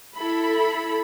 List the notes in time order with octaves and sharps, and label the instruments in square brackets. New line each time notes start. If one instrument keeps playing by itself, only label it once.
[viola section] E4 A4 B5